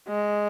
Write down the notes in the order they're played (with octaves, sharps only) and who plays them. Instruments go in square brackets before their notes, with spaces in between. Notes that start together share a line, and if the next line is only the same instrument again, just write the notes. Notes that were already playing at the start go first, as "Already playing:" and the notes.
[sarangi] G#3